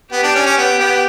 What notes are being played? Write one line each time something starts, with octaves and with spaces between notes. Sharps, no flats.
B3 G4
D4
C#4
C#4
B3
B3